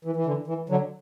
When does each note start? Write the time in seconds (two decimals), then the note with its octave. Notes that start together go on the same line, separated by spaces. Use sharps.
0.05 E3
0.16 E3
0.26 D3
0.47 E3
0.69 D3 F#3